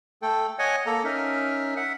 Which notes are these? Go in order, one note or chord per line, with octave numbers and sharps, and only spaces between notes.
A3 A4 G5
C#5 D#5 F#5 G#5
A#3 A4 A#5
C#4 D#4 A#4 E5
E5 F#5